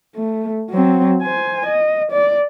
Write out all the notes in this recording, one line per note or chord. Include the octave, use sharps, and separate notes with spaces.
A3
F#3 C4
C5 G#5
D#5
D5